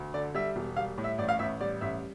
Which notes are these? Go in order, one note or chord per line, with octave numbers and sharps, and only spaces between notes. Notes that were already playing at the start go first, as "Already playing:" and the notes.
Already playing: D2
D3 D5
G3 E5
E1
G3 F5
A2
E5
A1 D5
F5
A1 E5
G3 D5
A1 E5